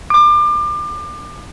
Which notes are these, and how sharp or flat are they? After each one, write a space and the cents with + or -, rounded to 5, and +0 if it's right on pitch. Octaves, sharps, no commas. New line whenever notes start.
D6 +30